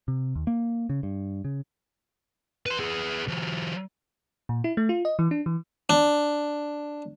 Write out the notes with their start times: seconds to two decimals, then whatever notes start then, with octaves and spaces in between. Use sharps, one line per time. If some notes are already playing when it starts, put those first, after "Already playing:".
0.08 C3
0.35 D#2
0.47 A#3
0.90 C#3
1.03 G2
1.45 C#3
2.66 B4 C6
2.79 B3 G#4
3.28 E3 F#3
4.49 A#2
4.64 E4
4.77 A3
4.89 F4
5.05 D#5
5.19 E3
5.31 D4
5.46 E3
5.90 D4